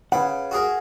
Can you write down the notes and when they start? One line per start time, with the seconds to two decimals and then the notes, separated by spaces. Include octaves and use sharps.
0.12 C#3 B4 F#5
0.51 F#4 G#4 A#4